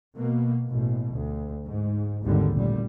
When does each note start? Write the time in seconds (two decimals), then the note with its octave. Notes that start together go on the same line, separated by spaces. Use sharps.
0.16 B2 A#3
0.68 A1 B2
1.13 D2
1.66 G#2
2.23 G#1 D#2 G#2 D3 G3
2.54 A1 A#2 G3